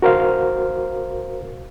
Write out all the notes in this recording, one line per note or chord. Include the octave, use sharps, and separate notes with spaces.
F#4 A#4 C5 F5